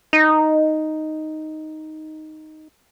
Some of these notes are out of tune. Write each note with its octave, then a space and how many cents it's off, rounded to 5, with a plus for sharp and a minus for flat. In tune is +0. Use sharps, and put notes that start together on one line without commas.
D#4 +0